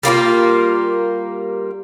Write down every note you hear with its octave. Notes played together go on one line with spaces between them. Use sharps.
G3 A#3 D#4 F4